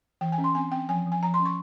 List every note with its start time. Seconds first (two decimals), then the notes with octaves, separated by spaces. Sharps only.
0.21 E3 G5
0.32 G#5
0.38 C#4
0.44 C6
0.55 C4 G#5
0.72 C4 G5
0.89 F3 G#5
1.06 F3
1.12 G#5
1.23 F3 A#5
1.34 C6
1.40 C#4
1.46 C#6